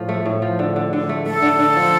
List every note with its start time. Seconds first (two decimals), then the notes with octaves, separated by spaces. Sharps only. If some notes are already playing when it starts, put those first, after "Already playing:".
Already playing: A2 F3
0.09 A3
0.26 A2
0.42 F3
0.59 D3
0.76 D3
0.93 D3
1.09 A3
1.26 A3 A4
1.42 D3
1.59 D3
1.76 F3